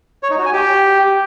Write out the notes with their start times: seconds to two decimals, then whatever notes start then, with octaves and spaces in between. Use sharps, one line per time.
0.23 C#5
0.30 D#4
0.38 F#4
0.46 G#5
0.53 G4